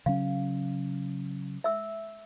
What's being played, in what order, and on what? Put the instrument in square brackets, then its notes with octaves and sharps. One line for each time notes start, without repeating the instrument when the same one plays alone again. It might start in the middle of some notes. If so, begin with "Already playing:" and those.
[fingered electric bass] C#3 F#3 C#4 [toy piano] F5
[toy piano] E5 E6